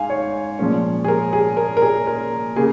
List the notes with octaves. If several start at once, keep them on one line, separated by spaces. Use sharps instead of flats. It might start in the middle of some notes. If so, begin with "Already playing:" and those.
Already playing: G#2 F5 G#5
C#5
A#2 F3 G#3 C#4
G#4
A#4
G#4
A#4
A#4
G#4
A#4
C#3 A#3 G#4